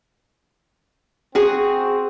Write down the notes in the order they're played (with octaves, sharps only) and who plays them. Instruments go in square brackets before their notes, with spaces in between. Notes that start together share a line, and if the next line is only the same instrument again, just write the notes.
[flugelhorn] C4 [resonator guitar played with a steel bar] F#4 G#4